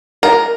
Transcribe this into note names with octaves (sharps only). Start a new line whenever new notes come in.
A#4